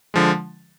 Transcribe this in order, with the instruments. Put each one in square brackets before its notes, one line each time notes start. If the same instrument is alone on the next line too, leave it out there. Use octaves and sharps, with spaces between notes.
[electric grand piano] D3 F3 G#3